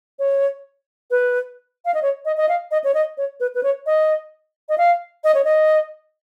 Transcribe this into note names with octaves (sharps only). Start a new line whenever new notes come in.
C#5
B4
F5
D#5
C#5
D#5
D#5
F5
D#5
C#5
D#5
C#5
B4
B4
C#5
D#5
D#5
F5
D#5
C#5
D#5